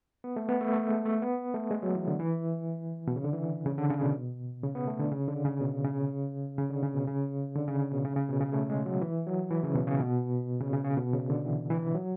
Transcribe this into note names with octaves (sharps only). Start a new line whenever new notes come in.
B3
A3
B3
A3
A3
G#3
A3
B3
A3
G#3
F#3
E3
D3
E3
B2
C#3
D3
E3
C#3
D3
C#3
B2
C#3
B3
A3
D3
C#3
D3
C#3
B2
C#3
C#3
D3
C#3
B2
C#3
D3
C#3
B2
C#3
C#3
B2
C#3
A3
G#3
F#3
E3
F#3
E3
C#3
B2
C#3
B2
C#3
C#3
C#3
B2
C#3
D3
E3
E3
F#3